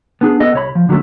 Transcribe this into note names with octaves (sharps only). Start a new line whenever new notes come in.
B3 D4 G#4
B3 A4 D#5
C2 C#5 B5
F3
D3 F#3 G#3 A3 C#4